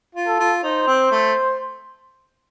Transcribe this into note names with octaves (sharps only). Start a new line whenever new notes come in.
F4
A4
F4
D#4 C5
C4
A3